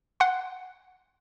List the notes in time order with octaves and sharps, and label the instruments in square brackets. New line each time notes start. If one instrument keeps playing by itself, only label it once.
[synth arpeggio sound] F#5 C6